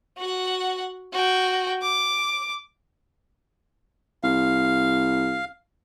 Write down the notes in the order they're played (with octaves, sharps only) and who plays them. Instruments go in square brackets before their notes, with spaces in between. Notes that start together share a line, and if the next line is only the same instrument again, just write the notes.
[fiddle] F#4 F#5
F#4 G5
D6
[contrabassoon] C2 [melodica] F5